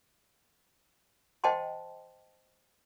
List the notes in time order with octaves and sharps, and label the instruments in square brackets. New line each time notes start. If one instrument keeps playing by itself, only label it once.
[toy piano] C5 D#5 F#5 G5 A5 C6